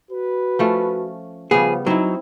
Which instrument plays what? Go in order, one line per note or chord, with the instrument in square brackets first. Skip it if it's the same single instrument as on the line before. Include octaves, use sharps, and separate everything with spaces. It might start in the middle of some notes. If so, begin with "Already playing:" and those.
[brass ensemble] F#4 B4
[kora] F3 A3 C#4
[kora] C#3 G3 B3 [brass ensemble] F3 [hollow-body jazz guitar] G#4
[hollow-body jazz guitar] F#3 [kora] C4 E4 [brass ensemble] D#4